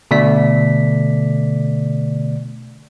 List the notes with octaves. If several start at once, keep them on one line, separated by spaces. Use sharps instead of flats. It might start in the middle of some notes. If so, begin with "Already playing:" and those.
B2 D3 A3 D5 B6